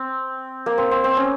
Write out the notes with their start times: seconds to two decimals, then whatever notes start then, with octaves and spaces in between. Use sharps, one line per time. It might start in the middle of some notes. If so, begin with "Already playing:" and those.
Already playing: C4
0.66 A#3
0.78 C4
0.91 C4
1.04 C4
1.17 C#4